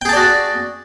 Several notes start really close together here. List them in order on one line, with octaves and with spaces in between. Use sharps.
G5 G#4 A5 D5 F#4